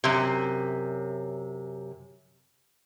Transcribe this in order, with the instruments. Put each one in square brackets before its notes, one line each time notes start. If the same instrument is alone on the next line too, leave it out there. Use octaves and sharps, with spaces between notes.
[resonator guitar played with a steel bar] F#2 C3